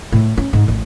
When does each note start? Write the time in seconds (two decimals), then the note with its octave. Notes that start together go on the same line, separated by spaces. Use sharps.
0.12 A2
0.37 C#4
0.53 G#2
0.68 A1 A2